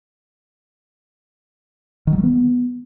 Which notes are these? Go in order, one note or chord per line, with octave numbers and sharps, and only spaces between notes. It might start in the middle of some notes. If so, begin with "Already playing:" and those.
D#3
F#3
G3
B3